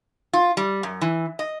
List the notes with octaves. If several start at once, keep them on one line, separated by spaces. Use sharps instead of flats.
F4
G3
F#2
E3
D#5